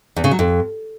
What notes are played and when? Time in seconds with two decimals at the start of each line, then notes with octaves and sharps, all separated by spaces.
0.16 E2
0.24 C#3
0.31 F#3
0.39 F2